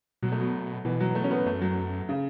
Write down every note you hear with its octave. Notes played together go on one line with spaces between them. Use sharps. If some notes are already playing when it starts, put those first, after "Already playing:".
B2 F#3
A3
F#3
B2 E3
F#3
A3
C#4
B3
F#2 A3
F#3
C#3